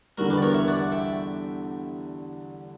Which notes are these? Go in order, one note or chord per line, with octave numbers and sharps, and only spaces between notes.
E2 D3 G3 F#4 A#4
G4 B4
D5
A#4 C#5
C#5 E5
D5 F#5
E5 G5